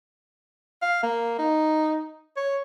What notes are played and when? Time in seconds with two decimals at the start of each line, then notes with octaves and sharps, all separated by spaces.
0.82 F5
1.03 A#3
1.39 D#4
2.37 C#5